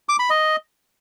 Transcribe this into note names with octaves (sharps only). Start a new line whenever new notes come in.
D6
B5
D#5